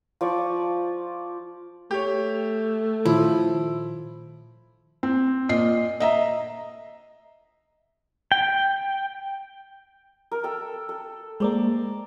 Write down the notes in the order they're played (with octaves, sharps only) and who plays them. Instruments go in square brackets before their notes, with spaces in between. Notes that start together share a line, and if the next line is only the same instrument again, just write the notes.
[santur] F3 D5 C#6
[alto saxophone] A3 [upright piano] G4 C#5
[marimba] A#2 D#3 [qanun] F3 [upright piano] E4
[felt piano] C4
A#2 D#5 C7
D#5 E5 A#5
[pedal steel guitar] G5
[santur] A#4
A4 G5
A4
[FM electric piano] G#3 A#3 [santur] C5 D5 A#5